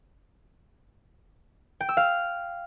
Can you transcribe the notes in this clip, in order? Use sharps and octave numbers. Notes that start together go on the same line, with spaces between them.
G5
E6
F5